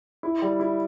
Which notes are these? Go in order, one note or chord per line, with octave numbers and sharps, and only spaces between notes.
E4
G3
E4